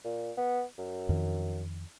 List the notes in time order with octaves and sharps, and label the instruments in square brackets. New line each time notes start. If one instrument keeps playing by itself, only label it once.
[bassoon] A#2
B3
F#2
[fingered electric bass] F2 D#3